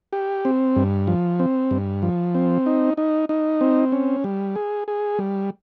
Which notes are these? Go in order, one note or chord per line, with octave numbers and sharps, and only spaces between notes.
G4
C4
G2
F3
C4
G2
F3
C4
D#4
D#4
D#4
C4
C#4
G3
G#4
G#4
G3